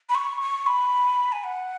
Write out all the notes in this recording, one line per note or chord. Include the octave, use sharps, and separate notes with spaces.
B5
C#6
C#6
B5
G#5
F#5